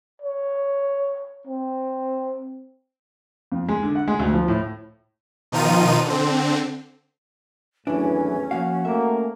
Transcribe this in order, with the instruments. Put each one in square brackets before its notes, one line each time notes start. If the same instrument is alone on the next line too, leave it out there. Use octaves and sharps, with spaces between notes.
[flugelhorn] C#5
C4
[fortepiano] F2
G#3
D3
F#5
G#3
D2
F3
A2
[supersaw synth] B2 D#3 F3 D#4 F4 D#7
D3 C4
[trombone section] G#1 E2 A2 [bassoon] E3 [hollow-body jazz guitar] F#3 D4 [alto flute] C#4
[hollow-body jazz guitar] F3 A#3 F5 [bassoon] F#4
[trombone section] A3 A#3 [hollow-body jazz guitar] E5